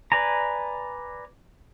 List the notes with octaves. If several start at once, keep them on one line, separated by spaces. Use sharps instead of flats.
B4 D5 G#5 A#5